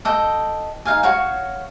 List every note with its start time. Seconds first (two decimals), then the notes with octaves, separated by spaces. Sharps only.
0.05 A4 D#5 G5
0.85 D#4 F5 G#5
1.03 F#4 C#5 F5 C#6